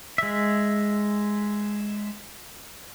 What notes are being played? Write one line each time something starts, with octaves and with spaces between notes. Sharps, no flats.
G#3 E5